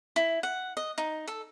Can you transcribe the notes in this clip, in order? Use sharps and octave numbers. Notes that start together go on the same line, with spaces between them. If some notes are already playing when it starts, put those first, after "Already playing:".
E4
F#5
D#5
D#4
A4